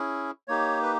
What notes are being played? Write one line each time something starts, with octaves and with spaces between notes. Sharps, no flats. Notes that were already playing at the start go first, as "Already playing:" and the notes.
Already playing: C#4 E4 G#4
A#3 D#4 G4 C#5
B4